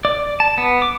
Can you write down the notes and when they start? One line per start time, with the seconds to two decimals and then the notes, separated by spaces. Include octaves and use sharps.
0.05 D5
0.40 A5
0.58 B3
0.82 D6